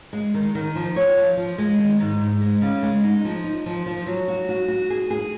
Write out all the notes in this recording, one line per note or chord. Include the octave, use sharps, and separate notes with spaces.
G#3
D#3
D#3
F3
C#5
F3
F3
G#3
D#3
G#2
G#2
G#3
C#3
G#3
D#4
F3
D#4
F3
F3
F#3
F#4
F#4
F#4
G#4
G#4